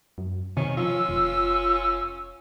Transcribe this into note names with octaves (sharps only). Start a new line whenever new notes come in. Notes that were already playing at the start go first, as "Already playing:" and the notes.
F#2
C3 D#3 C#4
F3 C#4 F4 E6
F1